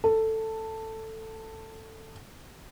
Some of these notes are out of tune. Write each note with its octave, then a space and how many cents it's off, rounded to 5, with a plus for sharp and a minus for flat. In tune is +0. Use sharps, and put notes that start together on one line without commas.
A4 +10